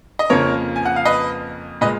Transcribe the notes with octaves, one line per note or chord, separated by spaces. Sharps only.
D#5
F2 C#3 F3 A#3 A#4 C#5
G#5
F#5
F5
B4 D#5
A#2 G#3 B4 D#5